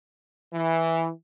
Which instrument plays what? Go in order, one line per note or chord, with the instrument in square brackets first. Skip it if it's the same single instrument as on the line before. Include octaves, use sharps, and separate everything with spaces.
[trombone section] E3